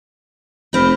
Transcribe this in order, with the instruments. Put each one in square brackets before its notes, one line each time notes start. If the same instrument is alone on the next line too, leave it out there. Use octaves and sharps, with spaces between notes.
[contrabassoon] F1 [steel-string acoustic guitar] C4 D#4 [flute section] B5 F6